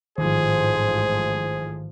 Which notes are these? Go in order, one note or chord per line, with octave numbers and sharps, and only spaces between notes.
A1 G#2 D#3 F3 G#4 C5